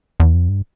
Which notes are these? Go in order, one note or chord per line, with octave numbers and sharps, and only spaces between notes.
E2
F2
G2